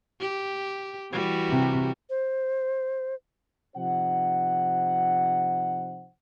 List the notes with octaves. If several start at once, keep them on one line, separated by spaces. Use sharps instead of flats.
G4
E3 G3 F#4
C3
C5
C3 F3 D#4 C5 F#5